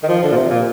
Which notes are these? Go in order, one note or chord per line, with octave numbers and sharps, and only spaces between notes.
D#3
F3
D3
A#2
C3
A#2